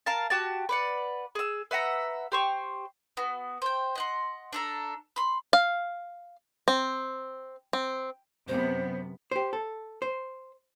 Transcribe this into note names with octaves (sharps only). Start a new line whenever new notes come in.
A#4 F5 A5
F#4 G4 A5
B4 D5 F#5
G#4 E6
B4 E5 F#5 A#5
G4 C5 C#6
B3 F#4
C5 G5
D#5 F#5 C6
D4 A4 A#5
B5 C6
F5
C4
C4
F#2 C3 B3 C5
G4 C5
A4
C5